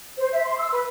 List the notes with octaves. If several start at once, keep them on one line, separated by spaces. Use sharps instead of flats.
C5
E5
C6
E6
B4